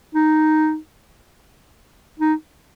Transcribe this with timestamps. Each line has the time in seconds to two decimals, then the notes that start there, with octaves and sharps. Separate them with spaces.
0.15 D#4
2.20 D#4